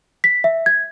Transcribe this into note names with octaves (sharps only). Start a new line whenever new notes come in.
B6
E5
G#6